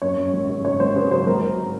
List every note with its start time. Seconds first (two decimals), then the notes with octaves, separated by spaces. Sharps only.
0.02 F#2 C#5
0.17 F#2
0.33 G#1
0.49 C#3
0.65 F#2 C#5
0.80 G#1 C5
0.95 C#3 B4
1.11 F#3 C5
1.27 G#1 A#4
1.43 G#1